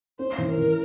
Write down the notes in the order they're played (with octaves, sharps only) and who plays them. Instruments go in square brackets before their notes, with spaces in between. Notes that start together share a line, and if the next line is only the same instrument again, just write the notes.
[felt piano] C#4 [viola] C5
[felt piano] E3
[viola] A#4
[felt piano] E3